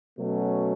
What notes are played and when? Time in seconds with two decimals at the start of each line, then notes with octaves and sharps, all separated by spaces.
0.18 B2 F#3 A3 C#4